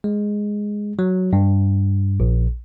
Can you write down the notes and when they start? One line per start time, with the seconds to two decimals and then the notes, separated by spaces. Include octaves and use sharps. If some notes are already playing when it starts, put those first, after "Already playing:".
0.04 G#3
0.99 F#3
1.33 G2
2.20 A#1